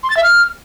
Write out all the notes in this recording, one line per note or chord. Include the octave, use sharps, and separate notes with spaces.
C6
A6
E5
F6